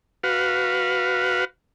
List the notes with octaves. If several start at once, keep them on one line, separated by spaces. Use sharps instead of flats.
F#4 B4 F5